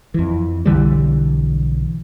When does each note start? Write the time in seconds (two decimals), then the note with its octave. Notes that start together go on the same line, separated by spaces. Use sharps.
0.14 F2 E3
0.66 B1 D3 E3 G3